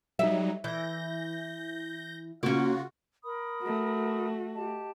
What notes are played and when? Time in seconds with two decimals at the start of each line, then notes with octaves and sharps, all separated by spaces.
0.19 F#3 G3 D#4 E5
0.64 E3 G6 A#6
2.43 C#3 A#3 C#4 F4 F#4
3.23 A#4 B5 D#6
3.62 A3 F#4
4.55 G4 D#5 A5